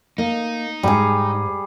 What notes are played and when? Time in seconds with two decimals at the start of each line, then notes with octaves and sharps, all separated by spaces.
0.18 A#3 D#4
0.83 G#2 G3 G#4